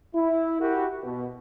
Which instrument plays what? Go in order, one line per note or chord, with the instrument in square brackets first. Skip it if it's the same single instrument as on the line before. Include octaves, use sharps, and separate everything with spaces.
[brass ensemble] E4
E4 F#4 G4 A#4
B2